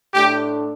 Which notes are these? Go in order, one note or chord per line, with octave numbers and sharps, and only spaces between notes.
A2 A3 D4 G4